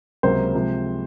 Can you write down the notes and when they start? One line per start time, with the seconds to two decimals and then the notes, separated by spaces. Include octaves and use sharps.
0.23 C#2 C3 F#3 A#3 C5
0.53 C3 F3 G#3